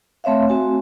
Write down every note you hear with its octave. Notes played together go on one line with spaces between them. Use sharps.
A3 C4 C#5 E5 F5
C4 F#4 G#5